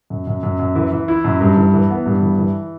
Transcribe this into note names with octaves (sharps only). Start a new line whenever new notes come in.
F#2
F#2
F#2
F#2
E3
E3
E4
F#2
G2
E3
E3
B3
G2
E3
E3